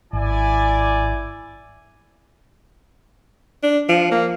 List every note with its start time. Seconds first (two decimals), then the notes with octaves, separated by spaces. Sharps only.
0.13 G#1 E4 D5 G#5
3.63 D4
3.89 F3
4.12 A#3